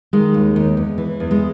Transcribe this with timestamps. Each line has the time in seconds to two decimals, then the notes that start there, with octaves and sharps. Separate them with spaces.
0.13 D#3 G#3
0.34 D#2
0.56 D#2
0.77 E2
0.98 E3
1.20 E2
1.31 G#3